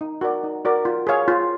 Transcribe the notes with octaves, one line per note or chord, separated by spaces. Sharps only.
D#4
F#4 A#4 D5
D#4
F#4 A#4 D5
F4
G#4 C#5 F5
F4